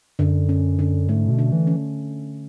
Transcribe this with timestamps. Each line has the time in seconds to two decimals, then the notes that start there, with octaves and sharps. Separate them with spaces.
0.19 F#2 D3
0.49 C#4
0.79 D3
1.09 G#2 A3
1.27 A2
1.30 B2
1.39 D3
1.52 E3
1.67 C#4